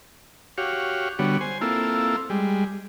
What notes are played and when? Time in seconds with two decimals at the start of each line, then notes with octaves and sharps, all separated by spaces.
0.58 F#4 G4 C#5 F5
1.19 D3 G3 B3 F#4 C#5
1.41 C5 G#5
1.61 A#3 C4 E4 F4 A4
2.30 G3 G#3